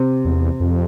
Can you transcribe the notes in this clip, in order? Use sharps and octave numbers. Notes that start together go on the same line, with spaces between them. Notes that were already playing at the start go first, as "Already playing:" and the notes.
Already playing: C3
E2
F2